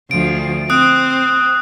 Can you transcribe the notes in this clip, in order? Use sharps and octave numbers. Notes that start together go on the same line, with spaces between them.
D2 F3 D7
C4 D#6 F#6 D7